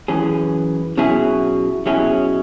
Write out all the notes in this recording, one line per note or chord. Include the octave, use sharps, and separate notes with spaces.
F#2 E3 C#4 G#4
B2 F#3 C#4 E4 G#4
B2 F#3 C#4 E4 G#4